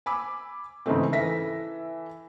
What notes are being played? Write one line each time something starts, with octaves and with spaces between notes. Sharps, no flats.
G#5 B5 D6 E6
G#2 C#3 E3 G#3 A3 C4
E3 A4 E5 A#6 B6